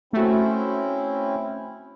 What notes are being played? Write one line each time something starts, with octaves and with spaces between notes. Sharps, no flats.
A3 C4 C#4 E4 F#4